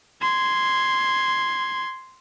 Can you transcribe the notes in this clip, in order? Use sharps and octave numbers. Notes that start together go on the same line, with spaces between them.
C6 G#6